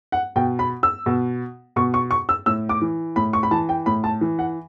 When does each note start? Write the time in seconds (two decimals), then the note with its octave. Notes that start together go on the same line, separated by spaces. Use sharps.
0.12 F#5
0.36 B2 G5
0.59 B5
0.83 E6
1.06 B2
1.76 B2 C#6
1.94 C#6
2.11 C#6
2.29 E6
2.46 A2 E6
2.69 D6
2.81 E3
3.16 A2 B5
3.33 C#6
3.43 B5
3.51 E3 A5
3.69 G5
3.86 A2 B5
4.04 A5
4.21 E3
4.39 F#5